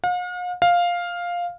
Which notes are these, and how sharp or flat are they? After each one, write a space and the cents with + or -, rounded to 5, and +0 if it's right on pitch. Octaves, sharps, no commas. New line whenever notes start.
F5 +45
F5 +5